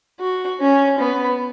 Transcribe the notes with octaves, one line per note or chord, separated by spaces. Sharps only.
F#4
C#4
B3